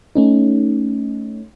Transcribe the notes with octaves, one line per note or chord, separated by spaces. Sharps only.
A3 C#4 D#4